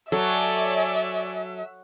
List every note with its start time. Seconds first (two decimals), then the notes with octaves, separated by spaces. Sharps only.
0.12 F#3 A4 C#5 D5 E5 G#5